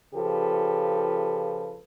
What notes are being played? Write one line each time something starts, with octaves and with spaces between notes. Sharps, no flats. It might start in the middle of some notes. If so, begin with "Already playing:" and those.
C#3 F3 F4 G4 A4 B4